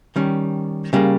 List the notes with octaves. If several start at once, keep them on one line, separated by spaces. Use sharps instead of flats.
D#3 G3 C#4
C#3 G3 A#3